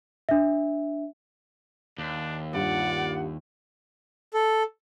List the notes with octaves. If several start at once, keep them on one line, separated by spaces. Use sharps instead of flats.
D4 E5
D#2 D4
G2 F4 D5 F#5
A4